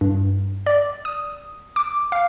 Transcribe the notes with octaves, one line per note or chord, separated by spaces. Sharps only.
G2
D5
D#6
D6
F5